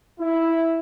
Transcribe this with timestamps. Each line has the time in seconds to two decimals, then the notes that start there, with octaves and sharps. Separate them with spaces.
0.20 E4